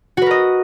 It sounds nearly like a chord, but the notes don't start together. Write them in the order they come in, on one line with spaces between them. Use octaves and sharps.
F#4 B4 A#4 D#5